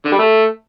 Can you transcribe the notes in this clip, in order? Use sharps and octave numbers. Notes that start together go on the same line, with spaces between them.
D3
G3
A3